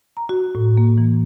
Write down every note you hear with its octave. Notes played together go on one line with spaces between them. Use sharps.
A#5
F#4
A2
A#3
E3